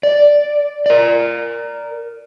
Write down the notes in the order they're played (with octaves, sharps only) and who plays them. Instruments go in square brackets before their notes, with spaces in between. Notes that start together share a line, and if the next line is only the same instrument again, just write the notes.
[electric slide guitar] D5
A#4 D5